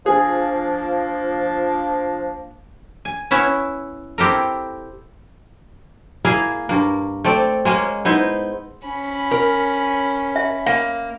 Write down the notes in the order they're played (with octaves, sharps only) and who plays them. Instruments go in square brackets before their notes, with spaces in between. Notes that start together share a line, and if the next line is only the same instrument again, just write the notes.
[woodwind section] F3 A#3 D4 [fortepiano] G#4
[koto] G#5
B3 C#4 E4 C#5 E5
C4 E4 G4 A4 A#4
[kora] A#3 E4 G#4 F5
G2 A#3
A3 C4 D5
G#3 A#3 C#4
B3 D#4 E4 C5
[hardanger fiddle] C#4 B5
[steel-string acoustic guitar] A#4
[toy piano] E5
[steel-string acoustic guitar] A#3 [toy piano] F5